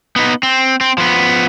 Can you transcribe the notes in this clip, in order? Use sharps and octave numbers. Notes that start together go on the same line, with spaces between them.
B3 D#4
C4
C4
F3 B3